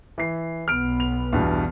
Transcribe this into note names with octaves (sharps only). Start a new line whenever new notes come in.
E3 C7
B1 B3 F6 D7
F7
E2 G2 B2